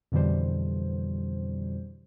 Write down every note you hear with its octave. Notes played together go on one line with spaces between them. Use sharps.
F2 B2 D3 E3 G3 C5